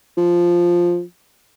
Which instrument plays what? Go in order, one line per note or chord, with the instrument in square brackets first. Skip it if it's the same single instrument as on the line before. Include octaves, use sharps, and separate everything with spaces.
[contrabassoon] F3